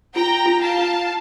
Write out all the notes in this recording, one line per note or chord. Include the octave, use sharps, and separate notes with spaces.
F4 G5 A#5
F4
F5 A5
F4